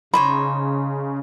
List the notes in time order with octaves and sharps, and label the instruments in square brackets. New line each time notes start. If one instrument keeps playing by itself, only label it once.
[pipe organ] C#3 [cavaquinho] D#4 C5 C#5 [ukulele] B5